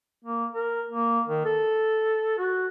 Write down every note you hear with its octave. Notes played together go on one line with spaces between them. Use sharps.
A#3
A#4
A#3
D#3
A4
F#4